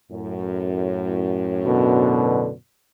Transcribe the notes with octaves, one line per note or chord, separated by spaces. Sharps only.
F#2 A2
B2 D3